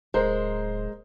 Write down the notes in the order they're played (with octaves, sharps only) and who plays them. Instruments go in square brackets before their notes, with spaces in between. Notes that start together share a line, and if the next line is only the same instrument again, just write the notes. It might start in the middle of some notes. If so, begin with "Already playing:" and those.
[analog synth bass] D1 [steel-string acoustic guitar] G#3 [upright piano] A#4 C5